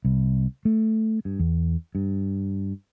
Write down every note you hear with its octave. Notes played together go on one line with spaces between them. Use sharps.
C2
A3
G2
E2
G2